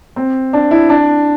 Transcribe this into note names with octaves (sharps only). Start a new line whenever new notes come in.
C4
D4
E4
D4